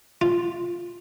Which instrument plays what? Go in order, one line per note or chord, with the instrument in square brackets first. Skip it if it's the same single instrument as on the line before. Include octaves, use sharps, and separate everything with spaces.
[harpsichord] F4